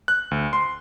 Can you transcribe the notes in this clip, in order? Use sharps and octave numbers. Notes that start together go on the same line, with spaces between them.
F#6
D2
C6